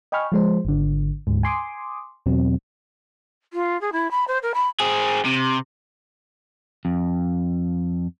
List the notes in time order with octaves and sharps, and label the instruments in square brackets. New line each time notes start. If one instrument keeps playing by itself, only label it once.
[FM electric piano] D#5 G5 G#5 B5 C#6 F6
F3 G#3 C5
G#1 D3
D2 G#2
G#5 C6 D6 D#6
E2 B2 F#3 C4
[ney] F4
G#4
E4
B5
C5
A#4
B5
[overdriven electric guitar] C4 G#4
C3
[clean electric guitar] F2